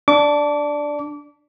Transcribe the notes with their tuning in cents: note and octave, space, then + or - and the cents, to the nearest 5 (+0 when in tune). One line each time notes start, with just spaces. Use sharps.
D4 +0 D6 -30